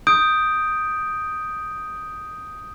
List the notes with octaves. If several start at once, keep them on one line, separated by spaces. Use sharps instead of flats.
D#6 G6 D7